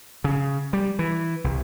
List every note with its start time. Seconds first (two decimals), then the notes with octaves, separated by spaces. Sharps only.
0.24 C#3
0.73 G3
0.99 E3
1.44 C2